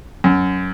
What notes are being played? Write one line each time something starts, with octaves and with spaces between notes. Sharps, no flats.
F#2